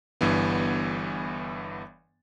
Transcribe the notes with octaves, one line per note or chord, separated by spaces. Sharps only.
G1 G2 E3 B3